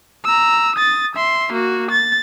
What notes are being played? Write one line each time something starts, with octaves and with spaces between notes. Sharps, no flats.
A#5 E6
D#6 A6
E5 C6
A#3 F#4
A6